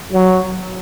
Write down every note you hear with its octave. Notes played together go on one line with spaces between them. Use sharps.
F#3